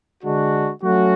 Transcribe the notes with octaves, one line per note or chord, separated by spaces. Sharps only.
D3 G#3 D4 F#4
F#3 A3 C#4 F#4